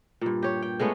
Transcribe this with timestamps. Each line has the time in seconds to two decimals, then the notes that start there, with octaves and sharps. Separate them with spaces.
0.21 G2 A#2
0.43 G4 C#5
0.62 G5
0.80 G#3 A3 B3 C#4